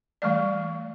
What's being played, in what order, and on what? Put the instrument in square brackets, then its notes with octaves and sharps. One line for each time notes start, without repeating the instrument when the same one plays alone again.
[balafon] E3 G3 A3 D5